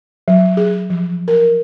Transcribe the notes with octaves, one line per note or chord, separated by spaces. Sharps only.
F#3
G#4
F3
A#4